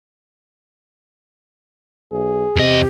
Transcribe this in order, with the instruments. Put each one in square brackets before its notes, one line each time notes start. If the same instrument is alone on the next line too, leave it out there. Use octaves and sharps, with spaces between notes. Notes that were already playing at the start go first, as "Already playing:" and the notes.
[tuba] B1 [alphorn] G#4
[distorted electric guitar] E2 D#5 [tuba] C3 [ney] G4